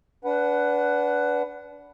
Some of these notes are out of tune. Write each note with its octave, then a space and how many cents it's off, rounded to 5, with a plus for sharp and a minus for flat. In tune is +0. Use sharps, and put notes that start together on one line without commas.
D4 -30 B4 +0 F#5 +5